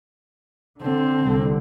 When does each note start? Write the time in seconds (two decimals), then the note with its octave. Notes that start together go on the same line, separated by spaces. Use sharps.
0.82 D3 C4
1.24 C2 D3